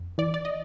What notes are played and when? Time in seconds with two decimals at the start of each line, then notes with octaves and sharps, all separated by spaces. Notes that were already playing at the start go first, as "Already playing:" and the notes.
Already playing: F2
0.18 E3 D5
0.34 D5
0.45 D#5